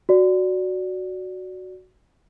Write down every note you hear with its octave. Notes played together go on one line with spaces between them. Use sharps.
F#4 D5